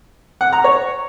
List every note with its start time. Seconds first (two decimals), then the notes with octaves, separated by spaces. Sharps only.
0.41 F#5
0.53 A#5
0.64 C#5